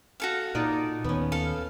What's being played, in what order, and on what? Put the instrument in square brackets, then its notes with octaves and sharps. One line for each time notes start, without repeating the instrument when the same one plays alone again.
[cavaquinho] F#4 A4 F5
[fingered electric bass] A#2 [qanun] D#4 F4 D5
[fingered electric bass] D#2 [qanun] B3 C#4
[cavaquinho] A4 F5